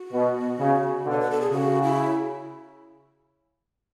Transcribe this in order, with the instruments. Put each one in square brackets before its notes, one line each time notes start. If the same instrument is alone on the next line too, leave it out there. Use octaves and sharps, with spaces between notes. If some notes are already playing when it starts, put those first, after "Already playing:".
Already playing: [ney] F#4
[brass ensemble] B2
C#3
[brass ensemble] B2 D3 [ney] C#5
[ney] B4
A4
G#4
[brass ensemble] C#3 [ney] F#4
[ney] E4